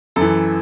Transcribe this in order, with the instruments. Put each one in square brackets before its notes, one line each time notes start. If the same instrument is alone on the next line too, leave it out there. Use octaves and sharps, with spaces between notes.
[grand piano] F#2 E3 A4